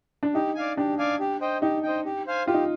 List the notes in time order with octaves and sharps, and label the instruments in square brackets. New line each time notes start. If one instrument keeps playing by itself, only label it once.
[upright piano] D4
[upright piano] D#4 [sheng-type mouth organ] G4
[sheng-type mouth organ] D5 F5 G#5
[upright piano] D4 [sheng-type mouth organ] G4
[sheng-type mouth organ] D5 F5 G#5
G4
C5 D#5 G5
[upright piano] D#4 [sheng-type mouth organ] G4
[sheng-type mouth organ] C5 D#5 G5
G4
C5 F5 G#5
[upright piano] F4 [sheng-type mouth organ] G4
[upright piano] D#4